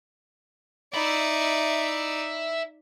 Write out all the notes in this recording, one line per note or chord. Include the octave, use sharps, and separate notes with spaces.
D#4 D5 E5 B5